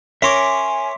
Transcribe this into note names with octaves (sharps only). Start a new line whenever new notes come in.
C#4 A#4 E5 G#5 C6 D6